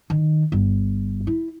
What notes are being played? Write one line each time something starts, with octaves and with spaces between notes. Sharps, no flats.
D#3
G1
E4